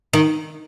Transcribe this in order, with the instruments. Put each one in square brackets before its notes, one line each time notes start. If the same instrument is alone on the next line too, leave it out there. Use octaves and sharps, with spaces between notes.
[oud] D#3